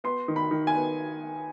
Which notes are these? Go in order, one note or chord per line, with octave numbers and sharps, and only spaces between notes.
B3 C6
D#3
B5
D#3
G#5
B3